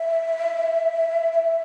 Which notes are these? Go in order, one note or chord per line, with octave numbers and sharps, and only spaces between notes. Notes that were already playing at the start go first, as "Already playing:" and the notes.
Already playing: E5
E5